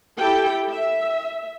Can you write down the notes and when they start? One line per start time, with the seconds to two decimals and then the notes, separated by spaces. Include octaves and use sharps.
0.18 E4 G4 A4 G5
0.69 E5